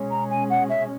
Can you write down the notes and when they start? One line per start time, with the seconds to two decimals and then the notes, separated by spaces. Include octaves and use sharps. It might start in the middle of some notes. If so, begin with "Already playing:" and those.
Already playing: B2 G#3 C#4
0.10 A#5
0.30 G#5
0.50 F#5
0.69 E5